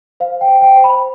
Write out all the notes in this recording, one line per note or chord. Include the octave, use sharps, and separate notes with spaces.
C5 F5
G5
C5
G5
C5
B5